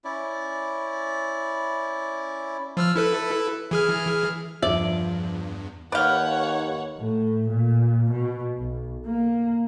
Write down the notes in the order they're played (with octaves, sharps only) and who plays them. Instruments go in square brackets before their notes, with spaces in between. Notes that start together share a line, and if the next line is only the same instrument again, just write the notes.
[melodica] C#4 E4 D5
[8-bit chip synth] F3 E6 F6
E4 A4 B4
E3 G#4 F6
[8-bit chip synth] E2 G2 [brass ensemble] F3 [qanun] D5 [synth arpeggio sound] E5
[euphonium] D#2 [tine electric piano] B4 G6 [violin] C#5 F#5 [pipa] D5 F5
[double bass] A2
A#2
B2
B1
A#3